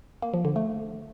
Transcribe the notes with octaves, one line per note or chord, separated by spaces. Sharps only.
A#3
F3
D3
A3